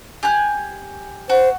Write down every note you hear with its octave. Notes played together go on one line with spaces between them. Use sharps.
G4 G#5 F#6
F#4 C5